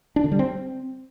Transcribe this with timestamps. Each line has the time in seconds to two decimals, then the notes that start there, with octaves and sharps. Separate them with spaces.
0.16 D4
0.24 D3
0.31 G3
0.39 C4